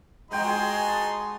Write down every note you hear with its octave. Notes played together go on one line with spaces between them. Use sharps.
G#3 D#4 F#4 G5 C6
G#4
A5